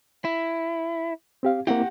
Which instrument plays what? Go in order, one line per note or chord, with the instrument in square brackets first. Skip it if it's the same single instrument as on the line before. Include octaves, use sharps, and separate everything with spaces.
[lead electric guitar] E4
[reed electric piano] C4 G4 F5
[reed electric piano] A#3 C4 E4 [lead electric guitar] G4 F#5